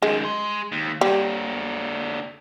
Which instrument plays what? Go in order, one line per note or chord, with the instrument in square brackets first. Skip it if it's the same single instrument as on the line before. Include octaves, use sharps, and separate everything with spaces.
[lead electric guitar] F#2 D#3 [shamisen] G#3
[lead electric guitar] G#4 C6
D#2
[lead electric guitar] D3 A#3 [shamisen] G3